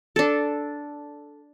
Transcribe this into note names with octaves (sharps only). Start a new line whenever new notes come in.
D4 A4